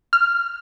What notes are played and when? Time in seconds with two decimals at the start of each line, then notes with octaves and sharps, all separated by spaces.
0.13 F6